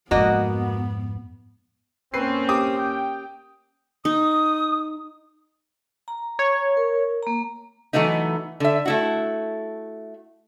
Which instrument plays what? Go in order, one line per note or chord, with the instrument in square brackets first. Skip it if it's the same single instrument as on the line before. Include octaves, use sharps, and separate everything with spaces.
[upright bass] F2 G#2 [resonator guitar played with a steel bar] A#3 F#4 D#5 [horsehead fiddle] B3
[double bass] A#3 C#4 [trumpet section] C4 [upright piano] B4 C7
[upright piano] G4 D6 D#6
[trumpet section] G5
[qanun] D#4 [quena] D#6
[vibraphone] A#5
[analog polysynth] C#5
[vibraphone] A#4
A#3 A#5
[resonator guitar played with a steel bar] E3 F#3 A3 B3 D#4
D3 E5
A3 E4 F#4